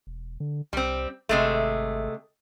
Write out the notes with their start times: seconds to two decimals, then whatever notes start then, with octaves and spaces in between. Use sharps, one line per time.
0.07 E1
0.40 D3
0.73 C2 G3 C4
1.29 G#1 C3 G#3 A3